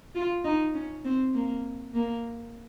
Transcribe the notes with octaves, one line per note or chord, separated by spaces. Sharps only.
F4
D#4
C#4
C4
A#3
A#3